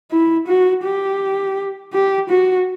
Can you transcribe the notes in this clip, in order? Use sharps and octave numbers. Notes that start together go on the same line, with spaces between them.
E4
F#4
G4
G4
F#4